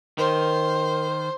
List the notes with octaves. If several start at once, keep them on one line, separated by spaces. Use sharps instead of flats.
D#3 A#4 C5